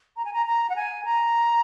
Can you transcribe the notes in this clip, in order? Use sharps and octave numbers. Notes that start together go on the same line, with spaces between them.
A#5
G#5
A#5
A#5
F#5
G#5
A#5